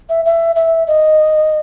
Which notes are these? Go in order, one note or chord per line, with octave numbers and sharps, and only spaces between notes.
E5
E5
E5
D#5